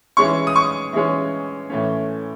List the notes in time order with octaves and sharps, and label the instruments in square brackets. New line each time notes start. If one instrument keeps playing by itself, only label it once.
[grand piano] E3 G#3 C#4 C#6
D#6
C#6
E3 G#3 C#4
A2 E3 A3 C#4